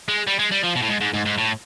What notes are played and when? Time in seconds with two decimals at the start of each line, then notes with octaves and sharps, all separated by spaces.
0.08 G#3
0.27 G3
0.39 G#3
0.52 G3
0.64 F3
0.76 B2
0.82 A2
0.89 G#2
1.01 G#2
1.14 G#2
1.25 G#2
1.38 A2